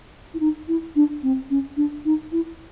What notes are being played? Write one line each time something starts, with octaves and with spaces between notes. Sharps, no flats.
E4
D#4
E4
D4
C4
C#4
D4
D#4
E4